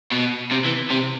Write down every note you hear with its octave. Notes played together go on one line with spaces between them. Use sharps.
B2
C3
E3
C3